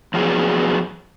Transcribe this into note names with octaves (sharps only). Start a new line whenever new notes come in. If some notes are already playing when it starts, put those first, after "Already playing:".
F3 F#3 B3 G#4 C#5